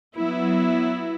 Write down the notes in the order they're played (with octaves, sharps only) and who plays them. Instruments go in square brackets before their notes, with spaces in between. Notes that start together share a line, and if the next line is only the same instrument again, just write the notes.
[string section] F#3 B3 E4